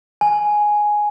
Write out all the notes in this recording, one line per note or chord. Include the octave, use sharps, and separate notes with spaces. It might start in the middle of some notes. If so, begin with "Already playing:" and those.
G#5